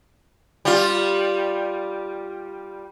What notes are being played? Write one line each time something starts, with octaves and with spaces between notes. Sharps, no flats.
G3 F4